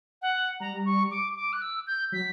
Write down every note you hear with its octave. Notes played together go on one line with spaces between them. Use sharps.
F#5
G3 A#5
C#6
D6
D6
F#6
E6
G6
F#3 B6